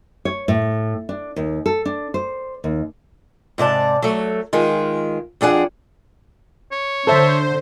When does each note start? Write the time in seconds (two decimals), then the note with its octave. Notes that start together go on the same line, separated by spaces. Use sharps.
0.25 C#5
0.48 A2
1.09 D4
1.36 D#2
1.66 A4
1.86 D4
2.14 C5
2.64 D#2
3.58 G#2 C3 D5 A5
4.02 F#3 A3
4.53 D#3 G#3 F4
5.41 F2 D4 G#4 F#5 G5
6.72 C#5
7.07 D3 A4 C5 E5